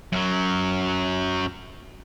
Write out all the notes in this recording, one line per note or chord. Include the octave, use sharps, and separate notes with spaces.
F#2 F#3